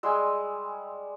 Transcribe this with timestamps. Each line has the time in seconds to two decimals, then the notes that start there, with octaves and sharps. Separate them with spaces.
0.03 G3 G#3 G#5 C6 E6